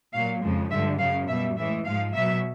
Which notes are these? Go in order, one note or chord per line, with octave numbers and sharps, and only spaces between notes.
A#2 F#3 F5
F2 C#3 F3 G#3
G2 D3 F3 G#3 E5
F#2 C#3 F#3 F5
B2 G3 E5
A2 E3 G#3 E5
G#2 F3 G#3 F5
B2 F#3 E5